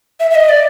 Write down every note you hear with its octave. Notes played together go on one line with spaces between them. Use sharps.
E5
E5
D#5
D5